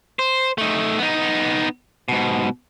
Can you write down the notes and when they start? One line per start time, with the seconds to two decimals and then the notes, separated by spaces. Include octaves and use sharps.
0.19 C5
0.58 A3 D#4
0.98 B3 D#4
2.08 G#2 B2